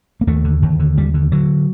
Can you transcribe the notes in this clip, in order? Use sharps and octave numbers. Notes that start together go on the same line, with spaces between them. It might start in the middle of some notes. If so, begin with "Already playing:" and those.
A#3
D#2 A3
D3
D#2
D3
D#2 G3
D3
D3 F#3